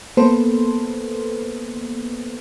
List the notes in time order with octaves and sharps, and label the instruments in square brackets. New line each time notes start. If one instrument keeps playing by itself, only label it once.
[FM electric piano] A#3 B3 A4 B4 C5